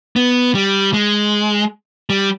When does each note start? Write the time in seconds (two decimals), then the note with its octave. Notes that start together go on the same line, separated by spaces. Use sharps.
0.16 B3
0.55 G3
0.94 G#3
2.10 G3